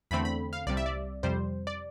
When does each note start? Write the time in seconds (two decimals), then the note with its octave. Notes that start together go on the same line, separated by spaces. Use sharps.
0.11 E2 D3 A3 C4 B5
0.25 B5
0.53 F5
0.67 C2 C3 G3 D5
0.77 E5
0.86 D5
1.23 F2 C3 G3 C5
1.67 D5